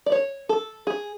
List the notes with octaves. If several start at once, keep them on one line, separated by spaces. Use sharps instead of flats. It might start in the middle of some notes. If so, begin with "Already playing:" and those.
D5
C#5
A4
G#4